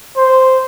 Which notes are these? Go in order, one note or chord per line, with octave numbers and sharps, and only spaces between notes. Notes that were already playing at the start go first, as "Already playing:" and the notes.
C5